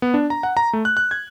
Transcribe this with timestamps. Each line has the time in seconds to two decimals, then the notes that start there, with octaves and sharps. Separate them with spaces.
0.02 B3
0.14 D4
0.30 A#5
0.43 F#5
0.57 A#5
0.73 A3
0.85 F#6
0.97 F#6
1.11 G#6